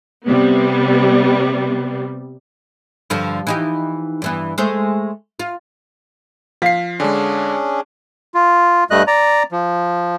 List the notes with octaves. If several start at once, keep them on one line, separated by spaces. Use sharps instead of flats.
C3 G3 B3
G2 D3 F3
E3 D#4 G4
G2 E3 B3
G#3 A3 C5
F4
F3 F5 B6 C7
D3 G#3 C#4 D4 G#4
F4
G2 G3 A3 D#5 F#6
D5 A#5
F3